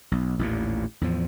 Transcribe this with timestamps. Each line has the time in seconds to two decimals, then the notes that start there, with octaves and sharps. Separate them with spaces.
0.12 B1
0.39 A1 D#2 A#2
1.01 E2 A2 F3